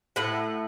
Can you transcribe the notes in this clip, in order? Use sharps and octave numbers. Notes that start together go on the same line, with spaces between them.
A2 F#5